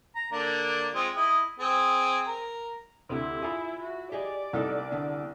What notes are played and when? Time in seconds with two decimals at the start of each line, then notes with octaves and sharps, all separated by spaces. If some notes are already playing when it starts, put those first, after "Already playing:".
0.16 A#5
0.32 D3 A#3 D4
0.94 G#3 C4 F4
1.16 E4 D#5
1.59 C4 G#4
2.28 A#4
3.09 D2 C3 E4
3.42 F4 G#4 E5 B5
3.82 F#4
4.12 G4 G#4 D5 D#5
4.53 C2 B3 D#4 A4
4.92 D3 B3 D4